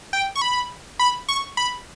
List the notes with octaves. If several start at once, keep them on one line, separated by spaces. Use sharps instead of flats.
G5
C#6
B5
B5
C#6
B5